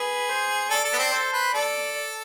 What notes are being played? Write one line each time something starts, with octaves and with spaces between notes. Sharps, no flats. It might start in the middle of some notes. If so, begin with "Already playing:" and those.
Already playing: G#4 B4
C5
A4 D5
A4
B3
C4
A4 C5
B4
A4 D5